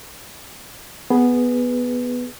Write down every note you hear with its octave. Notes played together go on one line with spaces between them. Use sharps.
B3 G#4 B4